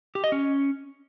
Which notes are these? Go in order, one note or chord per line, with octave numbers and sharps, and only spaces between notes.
G4
D#5
C#4